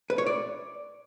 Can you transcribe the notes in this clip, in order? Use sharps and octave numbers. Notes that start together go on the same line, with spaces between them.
B4
C#5
D5